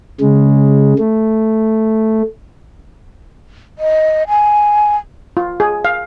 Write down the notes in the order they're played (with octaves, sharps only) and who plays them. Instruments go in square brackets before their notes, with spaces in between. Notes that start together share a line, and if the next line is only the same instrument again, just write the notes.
[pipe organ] C#3 G#3
A3
[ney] D#5
G#5
[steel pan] F4
G#4
F5